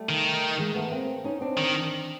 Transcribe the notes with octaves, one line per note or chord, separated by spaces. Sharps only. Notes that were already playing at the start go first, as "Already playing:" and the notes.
Already playing: G3 A3
D#3
G#3 A#3
A3 B3
A#3 C4
C#4 D#4
C4 D4
D#3